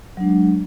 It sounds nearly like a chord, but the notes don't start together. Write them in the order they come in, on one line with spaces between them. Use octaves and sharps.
F#3 D4 G#3